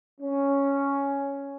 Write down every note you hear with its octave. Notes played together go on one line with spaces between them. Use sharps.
C#4